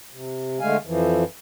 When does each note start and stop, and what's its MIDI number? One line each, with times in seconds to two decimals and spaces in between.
0.12 0.59 48
0.60 0.77 50
0.60 0.77 56
0.60 0.77 57
0.60 0.77 77
0.60 0.77 80
0.85 1.24 41
0.85 1.24 52
0.85 1.24 53